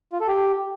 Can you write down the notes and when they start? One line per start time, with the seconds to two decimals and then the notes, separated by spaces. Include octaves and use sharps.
0.13 F4
0.20 A4
0.28 G4